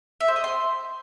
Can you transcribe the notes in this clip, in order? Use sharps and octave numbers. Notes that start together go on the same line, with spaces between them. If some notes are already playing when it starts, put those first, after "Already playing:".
E5
C5
D#5
C6